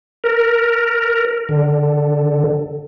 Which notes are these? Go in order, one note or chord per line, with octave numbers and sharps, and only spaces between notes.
A#4
D3